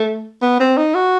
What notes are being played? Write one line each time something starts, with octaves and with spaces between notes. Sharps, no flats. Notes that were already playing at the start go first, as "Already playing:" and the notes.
Already playing: A3
B3
C4
D#4
F#4